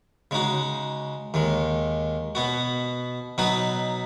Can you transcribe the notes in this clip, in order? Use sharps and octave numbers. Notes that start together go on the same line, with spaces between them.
C#3 G#3 D#4 F#4
D#2 D#3 G#3
B2 B3 F#4
B2 F#3 B3 D#4 B4